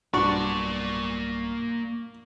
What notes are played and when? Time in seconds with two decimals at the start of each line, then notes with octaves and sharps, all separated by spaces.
0.14 B1 G2 A#3 D4 F#4 D5 C#6